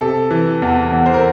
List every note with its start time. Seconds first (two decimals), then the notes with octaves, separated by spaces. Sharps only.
0.01 C3 A4
0.31 E3
0.62 E2
0.92 E2
1.06 C5
1.14 A#4